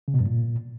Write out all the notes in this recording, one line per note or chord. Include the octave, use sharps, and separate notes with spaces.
C#3
B2
G2
A#2